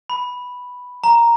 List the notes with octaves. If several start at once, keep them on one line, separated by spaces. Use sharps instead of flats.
B5
A#5